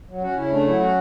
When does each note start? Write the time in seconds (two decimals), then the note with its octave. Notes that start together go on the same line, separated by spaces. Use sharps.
0.08 F#3
0.22 C#4 F#4
0.36 C#3 E4
0.51 A3 D4
0.66 F#3 E4
0.80 C#4 F#4